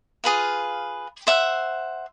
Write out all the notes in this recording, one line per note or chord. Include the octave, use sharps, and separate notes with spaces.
F4 G#4 B4 F5
C5 E5 F#5